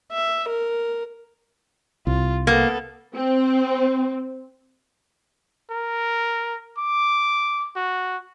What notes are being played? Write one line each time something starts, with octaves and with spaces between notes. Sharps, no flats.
E5
A#4
C2 F4
A#3 B3 A4
C4
A#4
D6
F#4